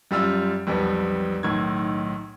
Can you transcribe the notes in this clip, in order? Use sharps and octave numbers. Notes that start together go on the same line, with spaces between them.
F#2 G3 F4 E6
B1 F2 G3 B3
B1 A2 D#3 G#6